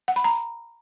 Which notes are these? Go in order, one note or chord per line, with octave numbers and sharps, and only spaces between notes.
F#5
B5
A#5